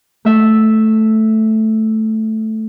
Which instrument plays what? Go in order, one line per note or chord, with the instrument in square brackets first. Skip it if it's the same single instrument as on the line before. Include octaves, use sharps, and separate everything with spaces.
[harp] A3 E5